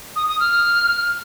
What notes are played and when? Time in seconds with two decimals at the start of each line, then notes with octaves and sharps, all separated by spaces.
0.16 D#6
0.28 D#6
0.40 F6